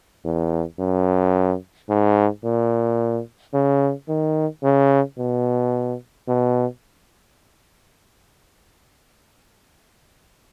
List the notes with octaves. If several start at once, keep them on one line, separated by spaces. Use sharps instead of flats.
E2
F#2
G#2
A#2
C#3
D#3
C#3
B2
B2